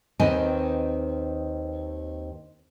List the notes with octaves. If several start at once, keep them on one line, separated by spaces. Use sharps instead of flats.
D#2 D#3 C4 B4 D#5 G#5